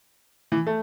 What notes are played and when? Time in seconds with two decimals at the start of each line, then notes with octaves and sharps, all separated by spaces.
0.52 E3
0.67 A3